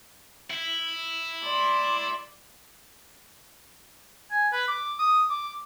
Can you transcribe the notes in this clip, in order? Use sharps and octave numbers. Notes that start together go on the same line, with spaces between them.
E4
D5 C6
G#5
B4
D6
D#6
D6